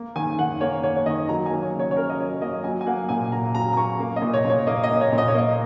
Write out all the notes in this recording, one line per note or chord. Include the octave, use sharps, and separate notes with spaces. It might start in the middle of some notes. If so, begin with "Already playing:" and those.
Already playing: A#3
D#3 G#5
D#3 F#5
A#3 C#5
A#3 C#5
C#5
D#3 D#5
F#3 A#5
G#5
A#3
C#5
C#3
C#5
C#5
C#3 A#4
D#5
F#3 C#5
A#3 D#5
F#3 G#5
G#5
A#3 F#5
A#2 G#5
A#2 A#5
F#3 A#5
A#5
A#3 C#6
A#3
D#5
A#2
C#5
A#2
C#5
A#3 D#5
D#5
A#3
C#5
A#2
D#5
C#5
A#3 D#5